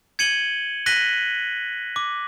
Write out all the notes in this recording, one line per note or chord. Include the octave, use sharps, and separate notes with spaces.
G#6 C#7 D#7 F#7 G7
F#6 A#6 B6 D#7 F#7 G7
D6